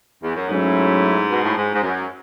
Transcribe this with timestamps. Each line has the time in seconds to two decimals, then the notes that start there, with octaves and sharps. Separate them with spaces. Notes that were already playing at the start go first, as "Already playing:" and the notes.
0.23 E2
0.36 F#2
0.49 G#2 F#3 A3 C#4 E4
1.31 B2
1.44 A2
1.57 G#2
1.74 G#2
1.83 F#2